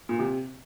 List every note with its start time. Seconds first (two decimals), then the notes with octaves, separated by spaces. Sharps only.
0.09 A#2
0.19 C3